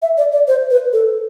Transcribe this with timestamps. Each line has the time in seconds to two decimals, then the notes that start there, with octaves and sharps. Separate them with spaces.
0.02 E5
0.18 D5
0.32 D5
0.48 C5
0.71 B4
0.93 A4